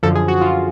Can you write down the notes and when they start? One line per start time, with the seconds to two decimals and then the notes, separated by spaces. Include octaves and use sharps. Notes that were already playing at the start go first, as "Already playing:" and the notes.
0.03 F#2 D3 F3 A4
0.15 G#4
0.28 F#4
0.41 F4